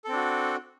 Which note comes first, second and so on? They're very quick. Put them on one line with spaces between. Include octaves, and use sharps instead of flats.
A4 C4 D4 F#4